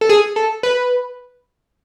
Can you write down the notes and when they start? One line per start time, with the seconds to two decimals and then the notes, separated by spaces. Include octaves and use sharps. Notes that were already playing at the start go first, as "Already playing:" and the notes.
0.01 A4
0.09 G#4
0.36 A4
0.63 B4